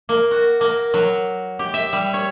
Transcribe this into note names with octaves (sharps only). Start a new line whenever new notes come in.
A#3
F#4
A#3
F#3
G4
E5
G3
C#5